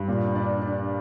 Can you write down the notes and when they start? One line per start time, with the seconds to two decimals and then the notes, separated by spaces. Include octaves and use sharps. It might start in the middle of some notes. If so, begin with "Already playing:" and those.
Already playing: G2
0.08 A#2
0.35 D4
0.62 D4